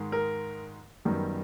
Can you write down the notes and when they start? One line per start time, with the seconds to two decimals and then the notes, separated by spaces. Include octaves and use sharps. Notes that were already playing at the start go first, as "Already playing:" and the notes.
Already playing: G#2 D#3 G#3
0.12 A#4
1.05 F#2 D#3 G3 B3